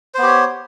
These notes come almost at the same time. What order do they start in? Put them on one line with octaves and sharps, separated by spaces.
C5 B3 G4 C#5